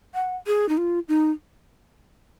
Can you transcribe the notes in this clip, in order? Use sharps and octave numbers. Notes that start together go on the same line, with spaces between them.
F#5
G#4
D#4
F4
D#4